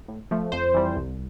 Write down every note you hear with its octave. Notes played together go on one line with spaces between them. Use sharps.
A2
F3 A3
F2 C5
E3 G3
C2